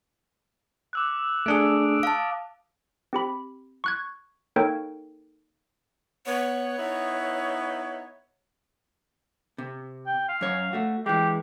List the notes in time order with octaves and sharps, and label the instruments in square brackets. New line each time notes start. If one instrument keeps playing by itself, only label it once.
[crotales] D6 E6 F#6
[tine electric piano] A3 D4 G#4 [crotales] D#6 F#6 D7
[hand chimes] F5 A5
[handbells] C4 G4 B5
C#6 F#6 G#6
A#3 D#4 A4 A#4 C#5 G5
[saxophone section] B3 [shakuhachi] C#5
[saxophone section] B3 D#4 E4
[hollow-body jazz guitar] C3
[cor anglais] G5
F5
[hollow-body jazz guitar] F#2 C#5
A3 F#4
[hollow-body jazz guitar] E3 G#3 [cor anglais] G4